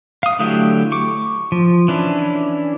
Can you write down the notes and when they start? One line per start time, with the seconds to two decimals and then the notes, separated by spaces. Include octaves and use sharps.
0.23 F5 D#6
0.39 D3 F#3 A3 E4 G4
0.92 C#6 D6
1.52 F3
1.88 E3 C#4 D4 E4